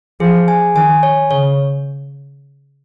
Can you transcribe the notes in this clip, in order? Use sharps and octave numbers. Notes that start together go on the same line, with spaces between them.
F3 G#4
G#5
D#3 G#5
C#5
C#3 C#5